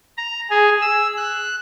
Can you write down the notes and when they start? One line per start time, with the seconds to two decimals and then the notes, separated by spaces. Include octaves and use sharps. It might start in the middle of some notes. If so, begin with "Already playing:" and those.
0.17 A#5
0.50 G#4
0.81 E6
1.17 F#6